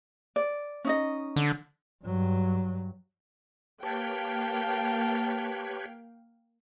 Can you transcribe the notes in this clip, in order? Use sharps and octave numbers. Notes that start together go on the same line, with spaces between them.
D5
C#4 D#4 D#5
D3
G2 F#3
A#3 G4 B4 C#5 F5 G5 A5